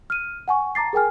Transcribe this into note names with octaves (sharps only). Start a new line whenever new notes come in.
F6 D#7
F#5 G#5 C#6
A5 A#5 D6 A6 C7
G#4 A#4 G5 G#5 F6